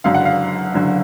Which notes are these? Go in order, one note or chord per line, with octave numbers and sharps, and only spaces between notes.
F#1 F#2 D3 F5
F#5
F5
F#1 F#2 D3